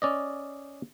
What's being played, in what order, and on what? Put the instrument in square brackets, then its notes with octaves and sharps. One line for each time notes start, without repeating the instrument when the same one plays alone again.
[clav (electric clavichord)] C#4 D5 D#5